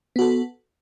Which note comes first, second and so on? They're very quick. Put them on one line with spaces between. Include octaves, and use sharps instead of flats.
B3 F#4 A4